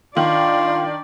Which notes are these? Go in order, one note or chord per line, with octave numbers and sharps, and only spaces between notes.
D#3 D4 F4 D5